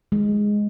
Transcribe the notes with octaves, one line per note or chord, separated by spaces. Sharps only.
G#3